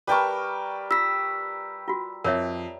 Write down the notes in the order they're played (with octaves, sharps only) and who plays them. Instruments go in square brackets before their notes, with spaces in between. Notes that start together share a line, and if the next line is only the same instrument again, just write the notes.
[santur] G3 A#4 C#6 [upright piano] B4 G5 A5
[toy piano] F4 [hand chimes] E6 B6
[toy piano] F4 F#4
[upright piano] F2 [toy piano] A#4 C#5 E5